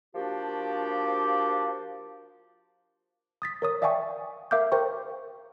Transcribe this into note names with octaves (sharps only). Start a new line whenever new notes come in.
F3 A#3 D4 F#4 G4
D#6 A6 B6
A#4 C#5 D#6
D5 E5 F5 G5 G#5 C#6
A#4 E5 F5 D6 F6 G6
A#4 C5 G5 C#6